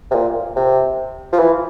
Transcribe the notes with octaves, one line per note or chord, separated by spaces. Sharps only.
C3
A#2
C3
F3
E3